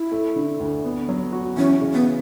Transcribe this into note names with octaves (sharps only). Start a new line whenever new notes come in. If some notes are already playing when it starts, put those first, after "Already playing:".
Already playing: E4
A3
D3
D2
B3
F#3
F#4
E3 C#4
C#3
B3